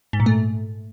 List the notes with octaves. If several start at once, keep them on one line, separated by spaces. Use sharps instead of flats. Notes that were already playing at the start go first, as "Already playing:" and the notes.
G#2
A#2
A3